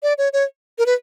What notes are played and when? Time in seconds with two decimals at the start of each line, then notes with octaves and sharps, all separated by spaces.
0.03 D5
0.18 C#5
0.33 C#5
0.78 A#4
0.86 B4